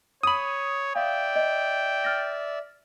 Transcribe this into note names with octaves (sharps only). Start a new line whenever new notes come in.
C#5 B5 D#6 D#7 F#7
D5 E5 F5 G5
D#5
F6 A6 A#6